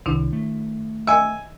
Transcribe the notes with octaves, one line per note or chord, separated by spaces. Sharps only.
C2 D#3 D4 E4
A3
D#5 E5 G#5 E6